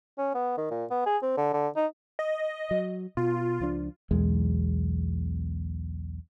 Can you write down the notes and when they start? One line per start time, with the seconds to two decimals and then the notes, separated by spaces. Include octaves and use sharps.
0.18 C#4
0.35 B3
0.57 D#3
0.71 A#2
0.91 B3
1.06 G#4
1.23 C4
1.37 D3
1.53 D3
1.76 D#4
2.19 D#5
2.71 F#3
3.17 B2 F4
3.60 C#2 F3 D4
4.11 B1 E2 G#3